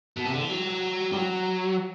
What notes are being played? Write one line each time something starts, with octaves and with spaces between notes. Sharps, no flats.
B2
C3
D3
E3
F#3
G3
F#3